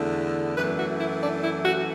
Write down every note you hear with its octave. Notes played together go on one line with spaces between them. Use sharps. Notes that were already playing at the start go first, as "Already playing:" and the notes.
Already playing: E2 D3 A3
F#2 E3 A3 B4
F#4
E4
D4
E4
F#4